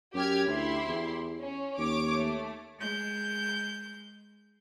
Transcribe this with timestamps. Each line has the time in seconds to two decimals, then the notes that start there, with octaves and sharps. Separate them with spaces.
0.14 F#2 G4 F6 G#6
0.48 D2 E4 G4 C6
0.87 E2
1.41 C#4
1.78 D#2 C#5 D6
2.13 A3
2.79 G#3 G6